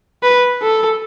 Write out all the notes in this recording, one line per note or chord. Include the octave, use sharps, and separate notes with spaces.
B4
A4